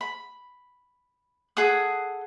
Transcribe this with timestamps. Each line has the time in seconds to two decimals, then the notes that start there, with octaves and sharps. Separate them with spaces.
0.01 B5
1.57 G#4 A4 F#5 D#6